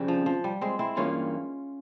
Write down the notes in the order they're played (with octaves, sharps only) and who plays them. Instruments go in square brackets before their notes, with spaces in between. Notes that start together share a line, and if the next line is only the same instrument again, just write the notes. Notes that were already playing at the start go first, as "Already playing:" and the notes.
Already playing: [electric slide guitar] F2 C#3 G3 C4
[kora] F3
F3
G3
G#3 C4
C4 E4
[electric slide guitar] G2 E3 A#3 [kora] C#4 F4